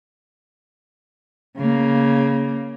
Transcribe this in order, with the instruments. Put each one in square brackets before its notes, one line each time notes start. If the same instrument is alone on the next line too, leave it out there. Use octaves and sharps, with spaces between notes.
[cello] C#3 A#3